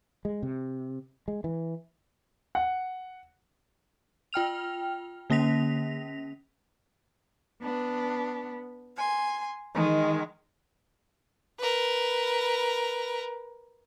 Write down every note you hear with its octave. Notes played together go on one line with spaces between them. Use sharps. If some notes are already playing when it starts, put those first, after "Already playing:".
G#3
C3
G#3
E3
F#5
F4 G5 F6 F7
D3 A#3 C#4 A#6 B6 F7
B3 D4
G#5 C6
D#3 G#3
A#4 B4